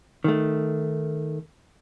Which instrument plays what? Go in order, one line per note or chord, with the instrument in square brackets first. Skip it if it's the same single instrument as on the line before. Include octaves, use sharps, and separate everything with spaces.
[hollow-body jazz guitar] D#3 A3